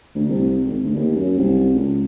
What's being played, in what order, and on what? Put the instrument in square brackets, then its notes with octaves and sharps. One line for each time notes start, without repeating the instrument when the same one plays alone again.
[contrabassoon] D2
C2
G#1
D2
D#2
F#2
C2
C#2